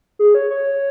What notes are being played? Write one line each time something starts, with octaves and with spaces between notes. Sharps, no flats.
G#4
C#5
C#5